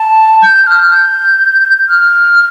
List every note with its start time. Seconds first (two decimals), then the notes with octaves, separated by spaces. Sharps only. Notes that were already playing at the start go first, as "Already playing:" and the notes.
Already playing: A5
0.42 G6
0.67 F6
0.91 G6
1.89 F6